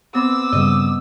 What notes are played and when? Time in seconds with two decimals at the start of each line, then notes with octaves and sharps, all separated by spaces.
0.15 B3 C4 D6 E6
0.52 G2 C#3 G3 D#5